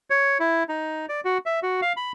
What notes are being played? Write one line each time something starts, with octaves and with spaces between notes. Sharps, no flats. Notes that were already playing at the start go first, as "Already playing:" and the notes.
C#5
E4
D#4
D5
F#4
E5
F#4
F5
B5